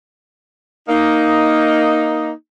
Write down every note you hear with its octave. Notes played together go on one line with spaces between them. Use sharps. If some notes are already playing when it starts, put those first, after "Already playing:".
A#3 D#4